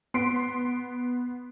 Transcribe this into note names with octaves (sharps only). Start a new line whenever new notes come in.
B3 C6 B6 C7 D7